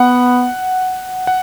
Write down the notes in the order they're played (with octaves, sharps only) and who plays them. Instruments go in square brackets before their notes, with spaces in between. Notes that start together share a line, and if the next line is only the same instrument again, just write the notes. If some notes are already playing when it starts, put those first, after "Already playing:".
Already playing: [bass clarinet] B3 [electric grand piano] F#5
[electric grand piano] F#5